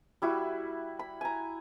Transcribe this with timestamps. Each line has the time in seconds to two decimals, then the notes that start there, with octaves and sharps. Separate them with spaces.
0.22 G3 E4 F#4
0.99 B5
1.21 G#5 A#5